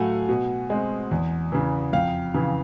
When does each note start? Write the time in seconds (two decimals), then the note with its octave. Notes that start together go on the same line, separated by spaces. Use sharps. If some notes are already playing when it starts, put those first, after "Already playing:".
Already playing: A2 F#3 A3 F5 F#5 G#5
0.29 B2
0.70 G#3 C4
1.11 E2
1.52 C#3 E3
1.93 F2 F5 G5
2.34 C#3 E3